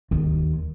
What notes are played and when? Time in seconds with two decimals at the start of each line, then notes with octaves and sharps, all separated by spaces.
0.11 D#2